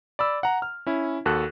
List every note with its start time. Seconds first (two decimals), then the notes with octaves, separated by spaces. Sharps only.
0.19 D5 B5 E6
0.43 F#5 A#5
0.62 F6
0.86 C#4 E4
1.26 D#2 F#4 A4 F#6